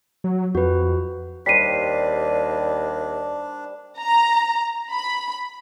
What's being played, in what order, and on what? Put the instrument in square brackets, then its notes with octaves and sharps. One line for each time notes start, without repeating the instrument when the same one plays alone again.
[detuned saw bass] F#3
[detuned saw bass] F2 [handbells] F#4 B4
[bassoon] D#2 [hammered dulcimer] G3 C5 [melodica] D4 [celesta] B6 C7 D#7
[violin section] A#5
B5